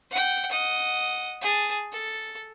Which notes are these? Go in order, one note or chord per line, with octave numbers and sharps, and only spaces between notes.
F#5 G5
D#5 F#5
G#4 A5
A4